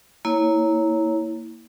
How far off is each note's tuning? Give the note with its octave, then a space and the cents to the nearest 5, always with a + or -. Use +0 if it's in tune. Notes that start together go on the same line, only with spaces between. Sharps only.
A#3 -10 E4 -20 C#5 +0